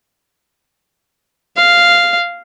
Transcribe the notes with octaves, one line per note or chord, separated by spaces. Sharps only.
F5